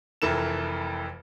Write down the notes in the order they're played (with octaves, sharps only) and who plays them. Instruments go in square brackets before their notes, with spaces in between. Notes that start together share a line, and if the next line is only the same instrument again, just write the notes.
[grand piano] F1 F2 E3 A4 A#4 E7